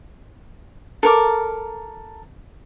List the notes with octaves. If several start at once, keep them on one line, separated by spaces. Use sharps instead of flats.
A4 A#4 D6